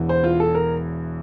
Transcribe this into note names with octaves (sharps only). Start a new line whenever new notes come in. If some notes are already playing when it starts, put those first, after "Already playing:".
Already playing: E1 E2 E3
C5
F4
A4
A#4